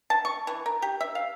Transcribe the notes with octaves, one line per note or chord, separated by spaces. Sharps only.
A5
C#6
E3
A#4
G4
E5
F5